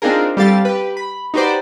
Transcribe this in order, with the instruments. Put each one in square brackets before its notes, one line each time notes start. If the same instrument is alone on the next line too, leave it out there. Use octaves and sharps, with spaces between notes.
[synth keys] C4 D4 D#4 F4 G#4 A#4
G3 C4 G4 A4 F5 A6
G4 B4
B5
D#4 F#4 G4 B4 C5 D5